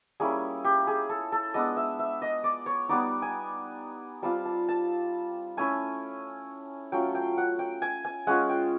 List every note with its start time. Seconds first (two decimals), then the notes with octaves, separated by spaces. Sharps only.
0.20 G3 A#3 C#4 E4 G#4
0.64 G4
0.87 G#4
1.09 A4
1.32 A4
1.54 G#3 B3 D4 D#5
1.77 E5
1.99 E5
2.22 D#5
2.44 D5
2.66 C#5
2.89 G3 B3 D#4 D5
3.22 G#5
4.23 G3 C4 F4 A5
4.45 A5
4.69 A5
5.57 A3 C#4 E4 G#5
6.92 F#3 A3 C#4 F4 G5
7.15 G5
7.38 F#5
7.59 G5
7.82 G#5
8.05 G#5
8.27 G#3 C#4 F4 F#5
8.49 G5